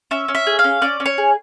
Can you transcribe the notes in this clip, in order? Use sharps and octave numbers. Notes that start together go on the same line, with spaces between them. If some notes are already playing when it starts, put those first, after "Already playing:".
C#4 E5
C#4
E5
G#4
F5
C#4
C#4 D5
C#4
C#5
G#4